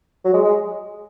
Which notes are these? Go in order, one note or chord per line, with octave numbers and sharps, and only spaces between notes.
F#3
G#3
G#3